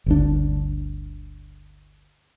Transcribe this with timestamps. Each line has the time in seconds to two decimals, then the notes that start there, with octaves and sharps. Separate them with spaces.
0.06 G1 D2 D4